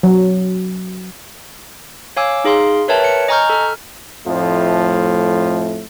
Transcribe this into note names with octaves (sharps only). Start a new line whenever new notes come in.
F#3
C#5 F5 G#5 D6 E6
D#4 G#4 F5 C6
A#4 B4 C#5 E5 G5 A5
C#5 C#7
D#5 G#5 A#5 C#6 F6 G6
A4 F6
F2 A2 F3 A3